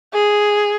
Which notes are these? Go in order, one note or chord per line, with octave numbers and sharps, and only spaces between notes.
G#4